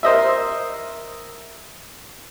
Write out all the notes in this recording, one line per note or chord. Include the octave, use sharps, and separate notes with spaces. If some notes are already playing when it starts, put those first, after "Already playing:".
A#4 C5 D#5 E5